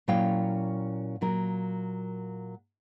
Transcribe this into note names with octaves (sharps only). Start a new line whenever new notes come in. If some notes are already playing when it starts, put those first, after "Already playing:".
A#2 F#3 C#4 E4 F5 G5
A#2 F#3 A#4